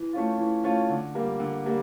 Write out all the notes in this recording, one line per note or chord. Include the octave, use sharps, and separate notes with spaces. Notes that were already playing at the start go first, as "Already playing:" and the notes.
Already playing: E3
A3 C#4 F4
E3
A3 C#4 F4
D3
G3 A#3
D3
G3 A#3